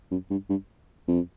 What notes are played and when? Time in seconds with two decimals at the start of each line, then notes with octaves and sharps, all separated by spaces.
0.11 F#2
0.30 G2
0.49 G2
1.08 F2